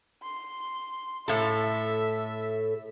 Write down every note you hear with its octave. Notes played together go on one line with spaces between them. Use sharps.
C6
A2 A4 E5